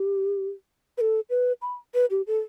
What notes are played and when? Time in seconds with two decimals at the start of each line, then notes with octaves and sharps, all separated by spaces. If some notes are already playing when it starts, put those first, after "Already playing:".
Already playing: G4
0.98 B4
1.01 A4
1.30 B4
1.62 B5
1.94 B4
2.10 G4
2.27 A4